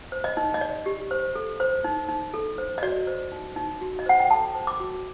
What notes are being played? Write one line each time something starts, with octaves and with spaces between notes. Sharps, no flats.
C5
D#5
D#4
D#5
D#4 D5
G4
C5
A4
C5
D#4
D#4
A4
C5
D#5
F#4 D5
C5
D#4
D#4
F#4
D#5
C5 F#5
G5
A4 A5
C5
D6
F#4